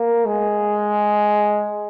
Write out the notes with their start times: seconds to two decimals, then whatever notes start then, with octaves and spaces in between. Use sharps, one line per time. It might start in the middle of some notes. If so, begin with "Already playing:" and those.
Already playing: A#3
0.25 G#3